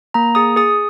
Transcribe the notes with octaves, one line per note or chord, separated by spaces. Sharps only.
A#3 A#5
G#4 D#6
G#4 D#6